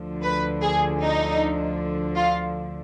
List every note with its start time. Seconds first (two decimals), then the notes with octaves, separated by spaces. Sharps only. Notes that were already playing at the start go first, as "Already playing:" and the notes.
Already playing: D2 D3 F3
0.23 B4
0.62 G#4
1.02 D#4
2.17 F4